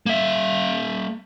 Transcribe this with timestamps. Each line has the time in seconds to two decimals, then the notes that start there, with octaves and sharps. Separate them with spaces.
0.06 A#3 E5